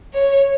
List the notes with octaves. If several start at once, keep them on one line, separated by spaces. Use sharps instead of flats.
C#5